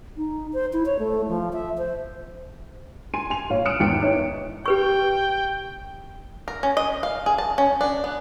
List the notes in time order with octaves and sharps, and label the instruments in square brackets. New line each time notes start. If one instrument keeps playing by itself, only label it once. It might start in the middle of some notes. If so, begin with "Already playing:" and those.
[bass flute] D#4
C5
E4
C#5
A3
F3
E5
C5
[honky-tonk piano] G#5 C6 D#7
G#5 F7
A#1 C#5 F5
D#6 F6 F#6 C#7 D7 E7
G#1 E2 G5 C#7 D7
D#4 E4 C#5
[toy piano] G4 B4 C#6 [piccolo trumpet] G5
[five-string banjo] A#4
C#4
D#5
F5
G#4
A5
C#4
D4
B3